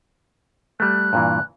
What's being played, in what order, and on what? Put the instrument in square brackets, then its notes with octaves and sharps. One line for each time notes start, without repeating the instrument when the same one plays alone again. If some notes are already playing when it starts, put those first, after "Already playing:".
[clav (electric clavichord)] G3 A3 [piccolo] F#6
[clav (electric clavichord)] G2 A#2 E3